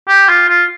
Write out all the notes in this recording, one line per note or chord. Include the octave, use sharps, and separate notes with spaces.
G4
F4
F4